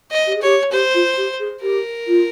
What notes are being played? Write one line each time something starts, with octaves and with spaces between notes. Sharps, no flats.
D#5
G4
G#4
G4 C#5
G4 C5
F4
G4
G#4
G4 A#4
F4